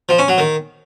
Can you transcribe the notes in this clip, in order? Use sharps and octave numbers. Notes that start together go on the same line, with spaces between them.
F3
C#4
F#3
D#3